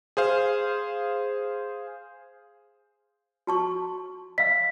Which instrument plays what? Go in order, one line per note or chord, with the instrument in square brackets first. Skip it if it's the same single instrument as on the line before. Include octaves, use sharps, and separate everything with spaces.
[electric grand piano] G#4 C5 F5
[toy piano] F#4 A5 C#6
[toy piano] D#5 F5 [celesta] B6